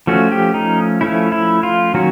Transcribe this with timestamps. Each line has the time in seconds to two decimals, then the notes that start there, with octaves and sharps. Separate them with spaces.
0.07 F3 A3 C#4 F#4
0.32 G4
0.54 D#4
1.01 F3 A3 C#4 E4
1.32 E4
1.63 F4
1.94 D#3 F#3 A#3 C#4 F#4